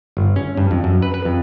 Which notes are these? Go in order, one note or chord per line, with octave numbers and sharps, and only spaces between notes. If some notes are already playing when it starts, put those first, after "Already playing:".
G1
C#4
G2
F2
F#2
B4
B4
F2